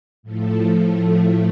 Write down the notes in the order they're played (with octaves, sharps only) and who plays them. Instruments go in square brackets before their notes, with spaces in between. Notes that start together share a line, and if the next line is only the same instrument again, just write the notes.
[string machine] A2 F3 A3